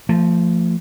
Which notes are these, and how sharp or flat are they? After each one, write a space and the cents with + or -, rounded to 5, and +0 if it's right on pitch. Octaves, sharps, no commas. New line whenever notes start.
F3 -10 A3 +30